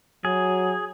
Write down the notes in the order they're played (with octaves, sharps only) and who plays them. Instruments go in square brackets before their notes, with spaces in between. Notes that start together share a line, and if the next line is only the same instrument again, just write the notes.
[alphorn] F#3 [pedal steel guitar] G#4